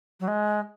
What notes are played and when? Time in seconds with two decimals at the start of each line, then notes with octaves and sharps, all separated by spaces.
0.20 F#3
0.28 G#3